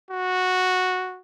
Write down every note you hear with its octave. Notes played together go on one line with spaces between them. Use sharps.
F#4